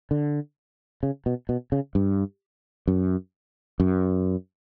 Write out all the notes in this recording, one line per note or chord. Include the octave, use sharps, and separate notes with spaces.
D3
C#3
B2
B2
C#3
G2
F#2
F#2